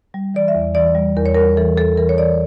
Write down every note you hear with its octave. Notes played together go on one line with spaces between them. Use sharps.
G3
E3 D5
E5
E2
E3 D5
G3
E2 A#4
C#5
G3 A#4
E3 A4
E2 A4
E3 A#4
C#5
E3 D5